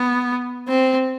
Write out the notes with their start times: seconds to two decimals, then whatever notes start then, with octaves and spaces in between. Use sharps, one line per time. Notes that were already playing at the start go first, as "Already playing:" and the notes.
Already playing: B3
0.68 C4